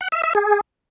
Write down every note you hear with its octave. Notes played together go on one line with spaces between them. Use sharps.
F#5
E5
E5
G#4